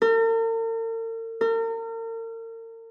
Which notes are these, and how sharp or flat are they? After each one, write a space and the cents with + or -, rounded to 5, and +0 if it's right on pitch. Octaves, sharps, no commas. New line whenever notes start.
A#4 -45
A#4 -40